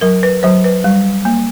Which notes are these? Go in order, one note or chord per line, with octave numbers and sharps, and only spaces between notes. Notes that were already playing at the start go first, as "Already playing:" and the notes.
F#3 A#4
B4
F#3 C5
B4
G3
A#3